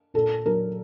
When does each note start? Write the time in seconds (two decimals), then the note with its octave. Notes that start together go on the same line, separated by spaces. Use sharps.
0.14 A#2 A4
0.46 F#3 A#4